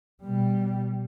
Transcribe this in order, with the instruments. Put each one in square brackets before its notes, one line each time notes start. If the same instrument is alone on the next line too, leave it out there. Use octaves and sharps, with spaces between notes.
[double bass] B2 G3